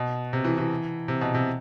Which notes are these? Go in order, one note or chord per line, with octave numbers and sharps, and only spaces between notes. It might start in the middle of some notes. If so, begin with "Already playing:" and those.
Already playing: B2
C3
E3
E3
C3
B2
C3